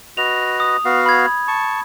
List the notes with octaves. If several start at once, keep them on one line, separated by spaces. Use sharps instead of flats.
F#4 B4 D#5 F7
D#6
B3 F#4 F5
B5 G#6
A5 C#6